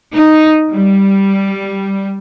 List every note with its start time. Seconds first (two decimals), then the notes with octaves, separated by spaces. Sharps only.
0.14 D#4
0.72 G3